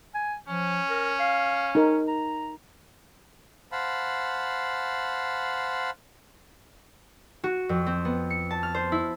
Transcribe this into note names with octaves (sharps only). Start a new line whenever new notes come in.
G#5
F3 C#4
A#4
F5
D#4 A#4
A#5
C5 F5 F#5 A5 B5
F#4
F2
C4
B3
C#7
A5
F6
C5
E4